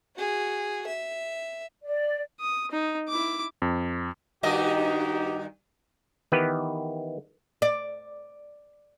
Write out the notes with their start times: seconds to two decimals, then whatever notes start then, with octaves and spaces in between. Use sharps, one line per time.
0.16 F#4 G#4
0.87 E5
1.84 D5
2.40 D#6
2.71 D#4
3.09 E4 D6
3.62 F2
4.43 G2 D#3 D#4 F#4 G4 D#5
6.32 D#3 E3 B3 G4 B4
7.62 D5